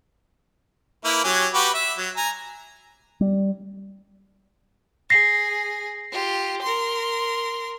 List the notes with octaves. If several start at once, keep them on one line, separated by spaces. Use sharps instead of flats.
A#3 E4 B4
F#3 C#4 G4
F#4 G4 B4
E5
F#3
G#5 A#5
G3
G#4 A#6 C7
F4 G4
A#4 C6